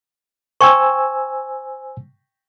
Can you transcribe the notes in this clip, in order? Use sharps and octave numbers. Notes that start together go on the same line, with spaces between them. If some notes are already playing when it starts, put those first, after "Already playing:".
C5 G5 G#5 C#6 E6